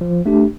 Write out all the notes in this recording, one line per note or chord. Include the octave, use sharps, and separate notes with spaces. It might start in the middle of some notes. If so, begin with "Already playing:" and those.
F3
A3 D4 G4